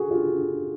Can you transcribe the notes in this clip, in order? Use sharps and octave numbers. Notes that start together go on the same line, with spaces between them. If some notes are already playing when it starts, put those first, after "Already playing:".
Already playing: F#4 G#4 A4
F4 G4